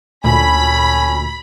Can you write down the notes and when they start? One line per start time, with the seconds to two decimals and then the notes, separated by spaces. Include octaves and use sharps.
0.24 D2 A#2 C#4 A4 G#5 B5